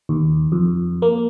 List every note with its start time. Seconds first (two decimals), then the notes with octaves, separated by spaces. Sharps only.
0.09 D#2
0.52 F2
1.02 A#3